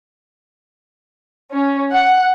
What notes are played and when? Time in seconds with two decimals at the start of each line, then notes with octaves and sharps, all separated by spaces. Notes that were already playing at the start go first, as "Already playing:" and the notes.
1.52 C#4
1.92 F#5